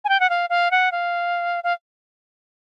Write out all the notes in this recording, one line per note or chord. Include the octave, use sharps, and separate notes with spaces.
G#5
G5
F#5
F5
F5
F#5
F5
F5